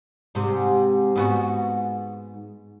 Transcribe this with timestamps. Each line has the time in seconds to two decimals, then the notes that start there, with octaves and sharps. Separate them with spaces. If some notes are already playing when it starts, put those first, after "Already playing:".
0.35 G#2 C3
1.16 G#2 B3 F#4